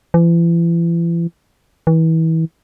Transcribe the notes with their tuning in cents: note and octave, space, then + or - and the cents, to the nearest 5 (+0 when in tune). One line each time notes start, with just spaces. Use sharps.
E3 +40
E3 -30